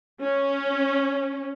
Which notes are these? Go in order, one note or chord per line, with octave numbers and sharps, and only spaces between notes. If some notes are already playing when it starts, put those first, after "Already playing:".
C#4